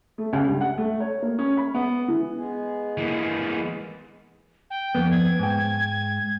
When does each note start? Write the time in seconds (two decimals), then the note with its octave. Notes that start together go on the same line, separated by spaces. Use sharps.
0.18 A3
0.33 C#2
0.45 G2
0.61 F#5
0.78 A3
1.00 C#5
1.22 A#3
1.39 C#4
1.57 B5
1.74 B3
2.08 E3
2.37 G#3 B3 G#4
2.98 E3 A#3
4.70 G5
4.95 F2 B3
5.11 G#6
5.39 G#2 G5